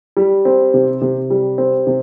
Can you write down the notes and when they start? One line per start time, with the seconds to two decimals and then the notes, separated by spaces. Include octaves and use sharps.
0.17 G3
0.45 C4
0.74 C3
1.02 C3
1.30 G3
1.58 C4
1.87 C3